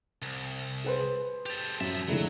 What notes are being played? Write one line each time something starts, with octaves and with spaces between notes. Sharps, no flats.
C2
G#4 B4 C5
G4 A4
F#2 F3 E5
F1 D3 F#3 G#3 E4